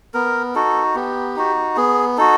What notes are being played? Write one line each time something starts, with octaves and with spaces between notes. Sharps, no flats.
B3 A#4
D#4 F#4 A4
B3 G4
D#4 F#4
B3 G#4
D#4 F#4 A4